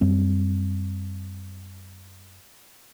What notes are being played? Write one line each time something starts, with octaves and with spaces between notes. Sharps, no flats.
F#2 G3 C4